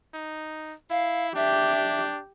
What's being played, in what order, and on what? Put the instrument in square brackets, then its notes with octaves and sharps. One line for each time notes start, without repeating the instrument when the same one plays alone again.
[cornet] D#4
[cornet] E4 [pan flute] F5
[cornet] D4 [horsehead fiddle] G4 [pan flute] E5